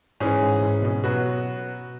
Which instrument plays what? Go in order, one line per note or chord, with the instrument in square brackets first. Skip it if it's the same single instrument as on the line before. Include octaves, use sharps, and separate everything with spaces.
[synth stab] G#2 [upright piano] E3 C#4 G#4
[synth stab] G#2
G#2
B2
[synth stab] B2 [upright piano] F#3 B3 F#4